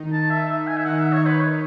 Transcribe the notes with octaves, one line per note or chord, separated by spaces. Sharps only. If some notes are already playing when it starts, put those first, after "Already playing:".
Already playing: D#3 D#4
A5
E5
E5
G#5
E5
D#3 D#4 F#5
E5
C#5
B4
C#5